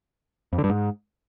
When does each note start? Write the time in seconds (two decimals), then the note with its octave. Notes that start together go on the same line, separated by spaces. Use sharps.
0.53 F2
0.58 D3
0.64 G2
0.70 G#2